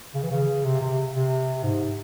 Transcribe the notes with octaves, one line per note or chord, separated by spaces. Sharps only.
C#3
E3
C#3
C3
C3
C3
G#2